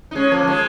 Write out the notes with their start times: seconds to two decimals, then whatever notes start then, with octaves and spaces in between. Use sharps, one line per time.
0.11 D#4
0.15 G#3 C#4
0.32 F3 A#3
0.43 F3
0.47 D#3 G#3